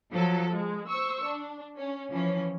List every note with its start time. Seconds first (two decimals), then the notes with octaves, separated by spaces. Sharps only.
0.13 F3 F#3 A4
0.51 G#3
0.88 C5 C#6 E6
1.24 D4
1.78 C#4
2.12 E3 F3 C#4